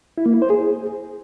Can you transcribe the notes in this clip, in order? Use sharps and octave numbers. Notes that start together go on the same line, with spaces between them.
E4
A#3
E4
C5
G#4